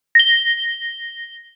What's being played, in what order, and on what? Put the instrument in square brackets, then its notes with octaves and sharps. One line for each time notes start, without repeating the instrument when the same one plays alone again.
[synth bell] A#6 G7